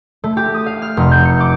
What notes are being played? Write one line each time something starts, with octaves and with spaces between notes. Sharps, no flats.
A3
G4
D#6
F5
F6
F1
G6
C#7
D6